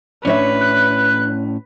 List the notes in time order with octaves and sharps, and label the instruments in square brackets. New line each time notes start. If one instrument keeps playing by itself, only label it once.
[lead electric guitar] A2 C#4 [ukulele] D4 C#5 E5 [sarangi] B4
[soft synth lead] F#6